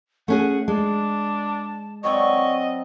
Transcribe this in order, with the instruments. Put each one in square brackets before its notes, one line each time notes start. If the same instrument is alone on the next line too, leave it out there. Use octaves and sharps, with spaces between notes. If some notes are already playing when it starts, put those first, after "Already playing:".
[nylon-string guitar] A3 C#4 G#4 [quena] F#5
[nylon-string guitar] G#3 [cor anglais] D4 [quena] A5
[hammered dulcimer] F#3 C4 D5 [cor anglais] D#5 [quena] C#6